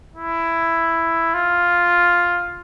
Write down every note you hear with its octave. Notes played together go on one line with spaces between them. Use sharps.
E4
F4